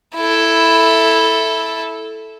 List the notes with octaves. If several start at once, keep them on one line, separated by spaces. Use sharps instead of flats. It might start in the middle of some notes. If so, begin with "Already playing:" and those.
E4 A4